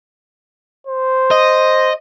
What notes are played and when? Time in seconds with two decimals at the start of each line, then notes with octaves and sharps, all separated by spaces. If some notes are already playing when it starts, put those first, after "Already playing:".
0.87 C5
1.31 D#5